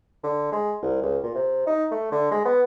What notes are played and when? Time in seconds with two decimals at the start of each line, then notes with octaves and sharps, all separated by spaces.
0.24 D3
0.52 G#3
0.82 C2
1.02 C#2
1.23 A#2
1.35 C3
1.67 D#4
1.92 A3
2.12 D3
2.31 G#3
2.45 B3